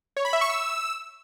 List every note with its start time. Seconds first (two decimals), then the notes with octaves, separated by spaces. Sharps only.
0.17 C#5
0.25 B5
0.33 E5
0.41 C#6
0.49 E6